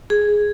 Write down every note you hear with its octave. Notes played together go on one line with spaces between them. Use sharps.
G#4